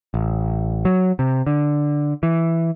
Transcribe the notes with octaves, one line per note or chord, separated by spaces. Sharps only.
A1
F#3
C3
D3
E3